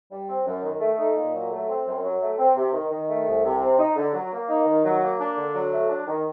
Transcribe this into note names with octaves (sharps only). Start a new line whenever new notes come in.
G3
C4
F#2
D#3
A3
D#4
A#2
F#3
A3
C4
F#2
F#3
A3
C4
C3
D#3
D#3
A3
C2
C3
C4
D#4
D3
F#3
A#3
D#4
D#3
F#3
A#3
D4
D3
F#3
A3
D4
D#3